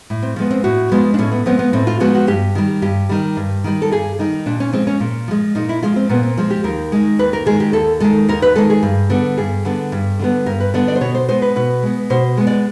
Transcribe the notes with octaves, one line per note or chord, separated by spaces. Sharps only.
A2
C4
F3 G#3 B3
C4
A2 F#4
F3 G#3 B3
D4
A2 C#4
B3
F3 G#3 B3 C4
B3
A2 C4
F4
F3 G#3 B3 F#4
F#4
G2 G4
D#3 G3
G2 G4
D#3 G3
G2
D#3 G3
A4
G2 G#4
D#3 G3 D#4
A#2 D4
C#4
F3 G#3 C4
C#4
A#2
F3 G#3
A#2 D#4
E4
F3 G#3 F4
C4
A#2 B3
C4
F3 G#3
G4
D#2 A#4
D#3 G#3
D#2 B4
A#4
D#3 G#3 G#4
G4
D#2 A4
D#3 G#3 A4
D#2 A#4
B4
D#3 G#3 A4
G#4
G2
D3 G3 B3
G2 G#4
D3 G3 B3
G2
D3 G3 B3
G2 A#4
B4
D3 G3 B3 D5
D5
C5
B2 C#5
C5
G#3 B3 C5
B4
B2 B4
G#3 B3
B2 C5
G#3 B3
D5